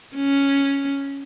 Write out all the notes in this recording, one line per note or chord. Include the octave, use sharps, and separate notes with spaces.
C#4